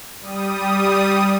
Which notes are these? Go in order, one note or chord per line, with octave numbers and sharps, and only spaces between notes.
G3 D#6